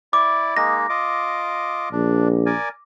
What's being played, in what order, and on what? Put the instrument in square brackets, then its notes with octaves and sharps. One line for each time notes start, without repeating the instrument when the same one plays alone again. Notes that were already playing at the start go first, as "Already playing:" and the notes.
[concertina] E4 D5 [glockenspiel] D6
[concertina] G#3 A#3 D#4 [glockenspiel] A#6
[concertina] F4 D#5 D6
[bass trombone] A#1 [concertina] D4
[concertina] A#4 D5 G#5